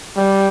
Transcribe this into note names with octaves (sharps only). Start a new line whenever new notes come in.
G3